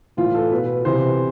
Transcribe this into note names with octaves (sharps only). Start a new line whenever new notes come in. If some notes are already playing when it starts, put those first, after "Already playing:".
A2 E3 F4
A4
B2 B4
C3 E3 C5